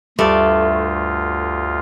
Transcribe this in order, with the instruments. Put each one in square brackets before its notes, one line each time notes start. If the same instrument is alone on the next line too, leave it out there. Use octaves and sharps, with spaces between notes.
[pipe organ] D2 F4 [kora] G2 D5 [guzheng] A3